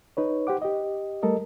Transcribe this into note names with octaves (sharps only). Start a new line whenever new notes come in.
D#4 B4 C#5
G4 C5 F#5 D6
G4 D#5
G3 A3 A4 A#4 D#5